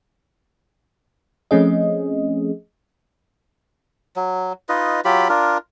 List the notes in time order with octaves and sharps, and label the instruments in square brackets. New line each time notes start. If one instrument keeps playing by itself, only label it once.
[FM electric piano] F3 A3 C4 C#4 G#4 D#5
[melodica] F#3
D#4 F4 B4 D#5
F#3 F4 G4 B5
D4 F4 A#4